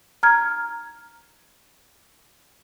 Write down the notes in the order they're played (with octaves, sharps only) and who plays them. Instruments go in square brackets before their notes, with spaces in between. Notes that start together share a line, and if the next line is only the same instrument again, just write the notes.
[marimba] A#5 F6 G#6